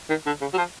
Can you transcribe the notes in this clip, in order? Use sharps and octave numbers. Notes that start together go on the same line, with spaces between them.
D#3
D3
C#3
F#3
F3